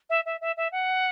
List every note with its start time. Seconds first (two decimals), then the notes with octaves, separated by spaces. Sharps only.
0.09 E5
0.25 E5
0.41 E5
0.57 E5
0.72 F#5